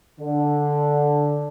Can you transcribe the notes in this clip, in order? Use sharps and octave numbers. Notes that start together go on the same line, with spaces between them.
D3